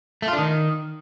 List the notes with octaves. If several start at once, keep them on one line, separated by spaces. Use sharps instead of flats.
A3
F4
D4
D#3